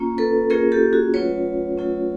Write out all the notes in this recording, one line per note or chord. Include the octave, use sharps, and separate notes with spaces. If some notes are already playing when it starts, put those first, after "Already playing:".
Already playing: A#3 C#4 F4
A4 B4
A#3 C#4 F4 G#4 A#4
G4 A4
F#4 G#4
F#3 A3 C#4 F4 B4 C#5
F#3 A3 C#4 F4